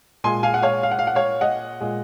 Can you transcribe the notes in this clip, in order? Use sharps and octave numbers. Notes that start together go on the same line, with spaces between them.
A#2 G#3 G#5 C6
F5 G#5
F#5
C#5 F5
F5
F#5
F5
F#5
C#5 F5
D#5 F#5
A#2 G#3